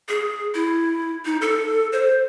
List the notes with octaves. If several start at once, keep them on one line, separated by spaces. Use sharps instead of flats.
G#4
E4
D#4
A4
C5